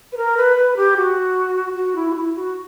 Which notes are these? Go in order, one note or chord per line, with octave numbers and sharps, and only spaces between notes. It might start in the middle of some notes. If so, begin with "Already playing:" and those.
B4
A#4
B4
B4
G4
F#4
F#4
E4
F#4
E4
F#4